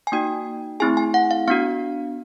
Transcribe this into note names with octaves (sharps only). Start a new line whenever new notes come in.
G#5
A#3 D#4 F#4 G5
A3 C4 E4 G#4 G#5
G#5
F#5
F5
B3 D4 F#4 F5